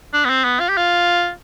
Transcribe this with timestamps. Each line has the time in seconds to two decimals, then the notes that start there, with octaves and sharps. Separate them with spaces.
0.14 D4
0.25 B3
0.30 C4
0.45 B3
0.60 F4
0.69 G4
0.77 F4